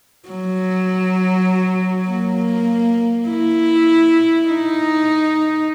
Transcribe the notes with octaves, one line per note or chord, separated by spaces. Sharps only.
F#3
A#3
E4
D#4